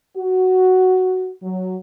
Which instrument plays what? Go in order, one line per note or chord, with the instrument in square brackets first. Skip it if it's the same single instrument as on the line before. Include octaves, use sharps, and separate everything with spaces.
[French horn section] F#4
F#3